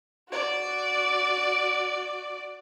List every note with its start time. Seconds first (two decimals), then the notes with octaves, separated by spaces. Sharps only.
0.29 F#4 D5